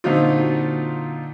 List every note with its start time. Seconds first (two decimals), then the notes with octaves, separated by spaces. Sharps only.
0.04 A#2 D3 F#3 C4 D#4 F4